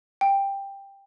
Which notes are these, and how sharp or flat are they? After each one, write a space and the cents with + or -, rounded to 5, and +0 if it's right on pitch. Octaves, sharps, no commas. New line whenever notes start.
G5 +10